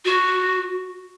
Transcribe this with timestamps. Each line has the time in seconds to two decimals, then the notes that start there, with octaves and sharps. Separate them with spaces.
0.05 F#4